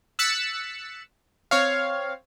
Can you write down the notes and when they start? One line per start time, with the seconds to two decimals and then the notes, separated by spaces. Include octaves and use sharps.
0.19 E6 F#6 A6 B6 C#7 E7
1.51 C4 C#5 F5